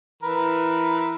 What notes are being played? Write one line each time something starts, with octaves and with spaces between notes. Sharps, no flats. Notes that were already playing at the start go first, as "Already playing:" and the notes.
E3 A#4 B4